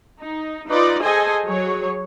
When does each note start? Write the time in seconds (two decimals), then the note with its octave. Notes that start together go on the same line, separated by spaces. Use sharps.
0.21 D#4
0.67 D#4 F4 B4 D5
1.02 G#4 A4 C5 D#5 G#5
1.45 F#3 G#4 C#5